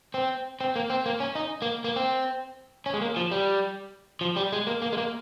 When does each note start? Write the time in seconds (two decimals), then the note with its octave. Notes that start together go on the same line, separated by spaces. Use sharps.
0.14 C4
0.61 C4
0.76 A#3
0.90 C4
1.06 A#3
1.20 C#4
1.35 D#4
1.62 A#3
1.84 A#3
1.96 C4
2.86 C#4
2.93 G#3
3.01 A#3
3.16 F3
3.31 G3
4.21 F3
4.36 G3
4.52 G#3
4.67 A#3
4.82 A#3
4.92 G#3
4.98 A#3